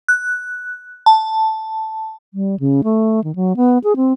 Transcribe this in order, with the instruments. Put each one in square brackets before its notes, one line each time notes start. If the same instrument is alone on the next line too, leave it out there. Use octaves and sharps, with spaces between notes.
[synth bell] F#6
A5
[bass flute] G3
C#3
A3
D#3
F#3
B3
G#4
C4